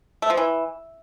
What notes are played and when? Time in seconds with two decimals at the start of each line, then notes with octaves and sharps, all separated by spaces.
0.22 A3
0.30 F3
0.37 E3